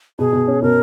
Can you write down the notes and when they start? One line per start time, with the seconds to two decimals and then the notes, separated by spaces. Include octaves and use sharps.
0.19 B2 G#4
0.33 B2
0.48 C#4
0.62 B2 A#4